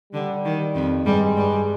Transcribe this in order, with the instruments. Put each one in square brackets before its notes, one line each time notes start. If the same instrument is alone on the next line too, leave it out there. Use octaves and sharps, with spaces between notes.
[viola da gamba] D3 [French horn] G3
[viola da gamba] D#3
F2 F3
[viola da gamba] G2 G3 [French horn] G#3
[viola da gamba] G2 G3